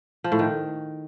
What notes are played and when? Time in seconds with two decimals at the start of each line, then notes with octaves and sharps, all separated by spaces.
0.24 F3
0.32 A2
0.39 D#3